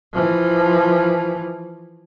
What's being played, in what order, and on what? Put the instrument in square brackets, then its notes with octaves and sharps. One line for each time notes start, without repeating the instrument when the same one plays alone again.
[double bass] E3 F3